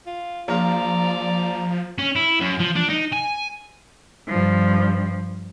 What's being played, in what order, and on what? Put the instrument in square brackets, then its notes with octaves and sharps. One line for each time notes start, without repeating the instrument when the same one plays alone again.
[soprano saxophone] F4
[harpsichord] A#1 F4 [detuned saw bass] F3 [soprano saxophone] D5 [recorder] A#5
[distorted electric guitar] C#4
E4
F#2
F3
D4
D#4
G#5
[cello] G2 F3